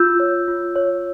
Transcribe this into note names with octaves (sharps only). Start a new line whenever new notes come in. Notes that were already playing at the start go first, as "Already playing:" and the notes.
Already playing: F4 E6 G6
C#5
F4
C#5